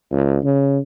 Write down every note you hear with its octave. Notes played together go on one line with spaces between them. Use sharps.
C#2
C#3